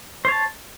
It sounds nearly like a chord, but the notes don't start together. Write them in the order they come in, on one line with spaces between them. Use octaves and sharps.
C5 C#5 A5